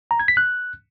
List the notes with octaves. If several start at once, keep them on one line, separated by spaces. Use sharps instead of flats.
A#5
G#6
B6
F#6